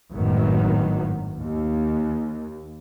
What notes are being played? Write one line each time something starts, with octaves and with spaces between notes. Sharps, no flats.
G#1 F#2 A2 D#3 F#3 B3
D#2